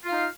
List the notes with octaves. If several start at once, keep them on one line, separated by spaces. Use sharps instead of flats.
D#4 F4 F5